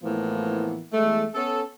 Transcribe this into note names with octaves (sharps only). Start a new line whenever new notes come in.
A2 E3 F3 A#3 B3
E2 G#3 A3
B3 C#4 A4